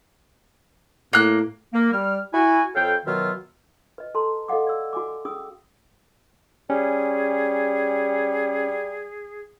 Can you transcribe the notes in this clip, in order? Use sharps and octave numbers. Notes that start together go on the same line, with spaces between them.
A2 A#3 F#6
A#3
G3 F6
E4 F#4 G#5
F2 A4 C#5 F5 G5
B2 D#3 F#3 F4 E5 F6
B4 D#5
A4 A5 A#5 C6
A4 D#5 F5 F#5 D6
D5 E6
F#4 G#5 D6
C#4 G#4 D#6 E6
G3 C#4 G#4